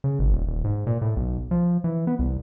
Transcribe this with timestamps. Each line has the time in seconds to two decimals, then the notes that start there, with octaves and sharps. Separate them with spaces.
0.04 C#3
0.19 G#1
0.33 D#1
0.47 D#1
0.64 G#2
0.87 A#2
1.02 A2
1.16 B1
1.51 F3
1.84 E3
2.07 B3
2.19 C2